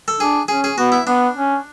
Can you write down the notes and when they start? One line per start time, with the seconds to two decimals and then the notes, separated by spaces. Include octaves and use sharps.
0.08 A4
0.20 D4 G#4
0.48 C#4 G#4
0.64 G#4
0.78 B3 F#4
0.92 E4
1.07 B3 D4
1.36 C#4